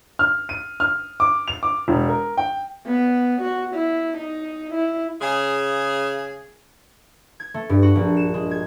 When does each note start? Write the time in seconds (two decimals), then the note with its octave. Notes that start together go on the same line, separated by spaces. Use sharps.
0.19 F6
0.49 D#7
0.80 F6
1.20 D6
1.48 F7
1.63 D6
1.88 E1
2.09 A#4
2.37 G5
2.86 B3
3.41 F#4
3.74 E4
4.17 D#4
4.73 E4
5.22 C#3 G#4
7.40 G#6
7.54 A3
7.69 G2
7.83 F#4
7.95 A#1
8.17 E7
8.34 G#3
8.51 G#6